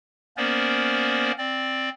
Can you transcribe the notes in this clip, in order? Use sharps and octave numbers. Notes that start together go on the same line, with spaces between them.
A#3 B3 C#4 A#4 C5 D5
C4 D5